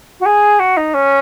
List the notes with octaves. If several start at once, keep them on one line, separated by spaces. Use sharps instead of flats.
F#4
G#4
F#4
D#4
C#4